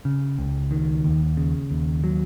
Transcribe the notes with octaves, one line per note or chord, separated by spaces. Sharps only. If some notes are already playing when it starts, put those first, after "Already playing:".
C#3
C#2
D#3
D#2
C#3
D#2
F#3